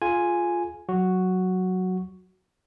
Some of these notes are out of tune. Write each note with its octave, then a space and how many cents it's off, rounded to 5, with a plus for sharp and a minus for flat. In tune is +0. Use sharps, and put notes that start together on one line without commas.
F4 +0 G#4 +45 G#5 +0
F#3 +0 F#4 +0